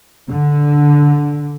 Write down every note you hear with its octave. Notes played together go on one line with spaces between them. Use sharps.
D3